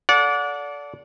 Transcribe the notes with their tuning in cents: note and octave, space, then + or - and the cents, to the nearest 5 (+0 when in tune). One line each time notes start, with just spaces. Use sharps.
A4 -10 D5 -25 F#5 -30